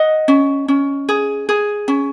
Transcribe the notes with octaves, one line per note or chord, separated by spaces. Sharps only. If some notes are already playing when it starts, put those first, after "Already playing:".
Already playing: D#5 F#5
C#4
C#4
G#4
G#4
C#4